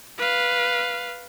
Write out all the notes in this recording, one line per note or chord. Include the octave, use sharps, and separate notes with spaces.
B4 F5